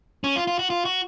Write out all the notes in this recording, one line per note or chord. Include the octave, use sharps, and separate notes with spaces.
C#4
F4
F4
F#4
F4
F#4